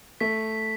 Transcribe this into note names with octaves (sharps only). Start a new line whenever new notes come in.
A3 B6